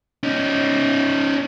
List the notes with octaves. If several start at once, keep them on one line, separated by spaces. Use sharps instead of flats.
C#4 D#4